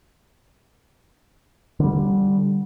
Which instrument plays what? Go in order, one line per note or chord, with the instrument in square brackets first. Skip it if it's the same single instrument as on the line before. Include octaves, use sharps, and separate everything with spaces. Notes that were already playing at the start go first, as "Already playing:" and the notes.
[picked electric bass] D3 G3